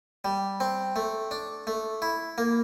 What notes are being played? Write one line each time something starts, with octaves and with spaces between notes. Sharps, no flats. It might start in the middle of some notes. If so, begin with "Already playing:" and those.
G3
C4
A3
D4
A3
E4
A#3